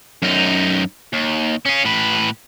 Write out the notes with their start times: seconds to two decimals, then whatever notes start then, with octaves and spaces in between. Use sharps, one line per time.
0.22 F#2 D#4
1.13 D#2
1.65 C#4 G#4
1.84 A2 B4